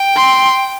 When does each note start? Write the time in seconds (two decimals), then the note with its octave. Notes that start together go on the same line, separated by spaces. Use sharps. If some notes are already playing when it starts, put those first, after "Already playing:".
Already playing: G5
0.16 C6